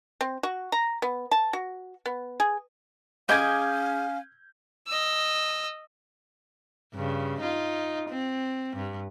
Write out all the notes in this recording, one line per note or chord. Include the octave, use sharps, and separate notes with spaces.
C4
F#4
A#5
B3
A5
F#4
B3
G#4
C#4 G#4 D#5 F5 D6 G6 G#6
D#5 E6
G2 C#3
D#4 F4
C4
G2